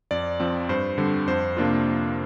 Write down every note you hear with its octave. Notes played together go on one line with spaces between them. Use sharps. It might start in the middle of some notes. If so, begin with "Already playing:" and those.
F2 D5
F3 C4
G2 C5
D3 G3 C4
F2 C5
C3 A#3 D4 F4